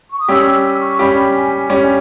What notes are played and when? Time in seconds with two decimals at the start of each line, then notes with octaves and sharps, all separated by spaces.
0.12 C#6
0.19 D#6
0.28 G3 C#4 G4 E6
0.46 E6
0.64 E6
0.81 C#6
0.99 G3 C#4 G4 B5
1.34 G#5
1.69 G3 C#4 G4 G#5